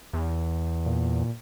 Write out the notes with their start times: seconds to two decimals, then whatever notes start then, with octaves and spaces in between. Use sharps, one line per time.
0.13 E2
0.86 A#2